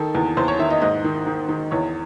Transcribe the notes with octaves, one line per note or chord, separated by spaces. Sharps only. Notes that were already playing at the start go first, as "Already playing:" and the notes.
Already playing: D#3 A4
E2
E2 C5
C#5
D#3 E5
D#5
G#2 D#5
D#3
D#3
D#3
E2 C#5